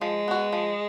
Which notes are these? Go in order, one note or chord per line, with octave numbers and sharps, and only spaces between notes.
F3 G#3
B3 F#4
F3